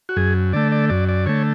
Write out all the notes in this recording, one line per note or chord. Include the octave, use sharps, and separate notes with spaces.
F#4
F#2 G#4
D3 A3 D5
D5
F#2 D5
D5
D3 A3 C#5